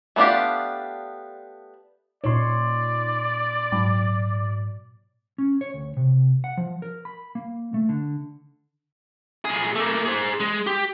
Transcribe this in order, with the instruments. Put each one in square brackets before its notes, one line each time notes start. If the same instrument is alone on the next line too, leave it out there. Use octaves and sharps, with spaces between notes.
[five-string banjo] A3 B3 D4 F4 G4
[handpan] A#2 C#5 [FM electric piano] D#4 C6 [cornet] D5
[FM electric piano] G#2 F#3
[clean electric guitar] C#4
C#5
D2
C3
F#5
F3
A#4
B5
A#3
A3
D3
[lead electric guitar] A#2 G#4
A3 A#3
G#4 C5
G#3
G4